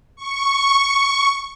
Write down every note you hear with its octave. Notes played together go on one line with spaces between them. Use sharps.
C#6